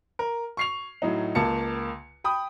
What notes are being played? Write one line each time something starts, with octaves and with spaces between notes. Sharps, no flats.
A#4
C#6 C7 F7
A2 F#3 D#4
C#2 A#3 A5 C#7
G5 B5 D#6